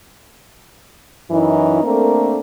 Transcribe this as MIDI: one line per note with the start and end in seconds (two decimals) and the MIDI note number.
1.30 1.82 42
1.30 1.82 52
1.30 1.82 61
1.30 1.82 63
1.30 1.82 64
1.84 2.40 57
1.84 2.40 58
1.84 2.40 60
1.84 2.40 62
1.84 2.40 69
1.84 2.40 70